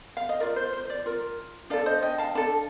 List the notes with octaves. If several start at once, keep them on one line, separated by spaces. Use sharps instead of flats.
F5
D#5
F4 A#4 D5
C5
C5
D5
F4 A#4
D4 A4 D5 F5
C5 D#5
D#5 G5
F5 A5
D4 A4 F5 A5